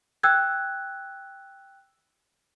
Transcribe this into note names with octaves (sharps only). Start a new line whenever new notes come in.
G5 E6 F#6 G#6